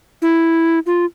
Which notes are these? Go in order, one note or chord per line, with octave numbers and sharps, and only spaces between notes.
E4
F4